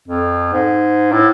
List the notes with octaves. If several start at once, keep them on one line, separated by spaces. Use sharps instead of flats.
F2
G#2
A2